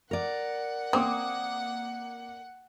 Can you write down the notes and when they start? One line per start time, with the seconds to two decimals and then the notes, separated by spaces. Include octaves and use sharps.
0.11 A#4 D5 F#5
0.93 A#3 C4 D6 D#6